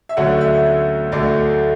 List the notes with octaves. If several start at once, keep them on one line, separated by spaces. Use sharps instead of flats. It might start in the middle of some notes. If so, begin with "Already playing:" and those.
E5
D2 D3 F#3 C#4 F#5
E5
D2 D3 F#3 D5